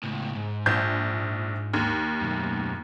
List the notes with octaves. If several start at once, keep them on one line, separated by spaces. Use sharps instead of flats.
C#2 A2
G#2
A#1 G6
D#2
B1 F#2